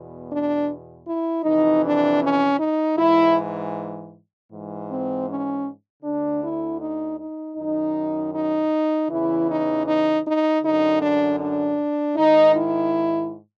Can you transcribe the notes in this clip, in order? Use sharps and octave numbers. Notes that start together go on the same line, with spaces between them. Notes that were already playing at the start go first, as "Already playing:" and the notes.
Already playing: E2 B2
D4
E4
F2 C3 E3 D#4
D4
C#4
D#4
G#2 E3 E4
G#2 E3
C4
C#4
D2 D3 D4
E4
D#4
D#4
F#2 D#3 D#4
D#4
E2 C#3 E3 E4
D#4
D#4
D#4
F#2 D3 D#4
D4
D4
G#2 D#3 D#4
E4